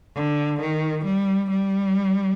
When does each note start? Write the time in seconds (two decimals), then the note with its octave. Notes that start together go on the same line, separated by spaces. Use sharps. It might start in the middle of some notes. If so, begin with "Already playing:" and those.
0.15 D3
0.61 D#3
1.05 G3
1.50 G3